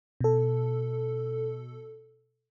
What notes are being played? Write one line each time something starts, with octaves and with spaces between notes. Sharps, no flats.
B2 A4